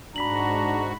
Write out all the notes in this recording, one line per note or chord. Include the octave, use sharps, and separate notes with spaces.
G#2 D4 F#4 A#5 B5 B6 F#7